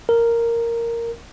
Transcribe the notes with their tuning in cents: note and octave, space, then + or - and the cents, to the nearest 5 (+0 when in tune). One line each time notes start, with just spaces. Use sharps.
A#4 -5